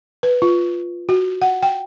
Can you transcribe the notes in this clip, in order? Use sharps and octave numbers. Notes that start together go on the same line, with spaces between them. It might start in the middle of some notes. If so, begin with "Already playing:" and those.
B4
F4
F#4
F#5
G5